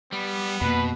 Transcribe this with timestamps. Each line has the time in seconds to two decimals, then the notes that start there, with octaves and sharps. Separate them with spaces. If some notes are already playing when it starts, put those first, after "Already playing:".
0.12 G3 B3
0.61 F2 B2 A#3 B4